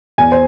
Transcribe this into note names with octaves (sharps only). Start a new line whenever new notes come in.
E2 G#5
C5